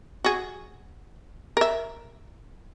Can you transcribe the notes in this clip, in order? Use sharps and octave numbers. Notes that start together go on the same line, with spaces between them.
F#4 G#4
A#4 E5